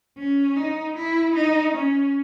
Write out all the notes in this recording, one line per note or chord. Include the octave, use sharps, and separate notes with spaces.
C#4
D#4
E4
D#4
C#4